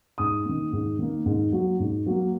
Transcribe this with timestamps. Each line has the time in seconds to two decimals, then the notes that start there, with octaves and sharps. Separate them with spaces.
0.18 G#2 D#6
0.45 D#3 A#3
0.72 G#2
0.99 D#3 A#3
1.26 G#2
1.52 F#3 A#3
1.80 G#2
2.06 F#3 A#3